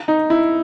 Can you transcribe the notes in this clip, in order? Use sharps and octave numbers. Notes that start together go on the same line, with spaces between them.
D#4
E4